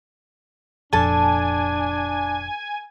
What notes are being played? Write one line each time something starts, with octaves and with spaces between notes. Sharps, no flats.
F1 F2 A#2 D4 A4 G#5 A5